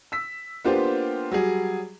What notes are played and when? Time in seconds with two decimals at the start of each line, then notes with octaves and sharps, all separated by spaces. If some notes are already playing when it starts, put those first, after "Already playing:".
0.12 E6 B6
0.65 A#3 B3 D4 F4 G4 C5
1.31 F#3 G3 G#4